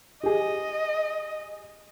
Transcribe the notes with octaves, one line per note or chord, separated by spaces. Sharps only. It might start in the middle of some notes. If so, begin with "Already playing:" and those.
G4 G#4 D#5